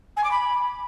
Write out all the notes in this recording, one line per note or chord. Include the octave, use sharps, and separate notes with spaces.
G#5
D6
B5